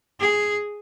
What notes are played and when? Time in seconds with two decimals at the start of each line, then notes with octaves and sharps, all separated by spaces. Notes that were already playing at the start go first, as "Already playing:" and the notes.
0.20 G#4